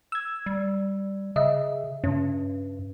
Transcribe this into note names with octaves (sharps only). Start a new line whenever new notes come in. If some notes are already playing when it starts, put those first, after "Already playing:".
E6 G#6
G3
C#3 D#5 E5
G2 C#3 C#4